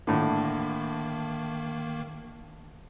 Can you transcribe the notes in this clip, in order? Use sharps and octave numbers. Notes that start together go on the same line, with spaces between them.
A2 D3 D#3 A#3